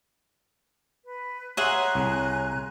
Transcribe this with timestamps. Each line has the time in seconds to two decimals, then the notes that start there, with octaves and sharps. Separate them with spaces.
1.05 B4
1.57 G#4 C#5 E5 F#5 G#5 A#5 C6 F#6
1.95 C2